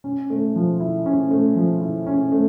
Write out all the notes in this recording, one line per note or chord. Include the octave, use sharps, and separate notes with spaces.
C#4
A3
F3
E4
C#4
A3
F3
E4
C#4
A3